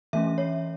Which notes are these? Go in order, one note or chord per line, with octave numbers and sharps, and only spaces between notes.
E3 A3 C#4 E5
C#5